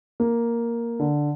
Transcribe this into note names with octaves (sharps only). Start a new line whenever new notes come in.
A#3
D3